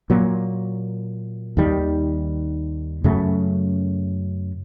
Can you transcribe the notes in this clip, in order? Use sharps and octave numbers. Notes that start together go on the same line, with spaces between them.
A#2 F#3 A#3
D#2 D#3 G3
F#2 C#3 F#3 A3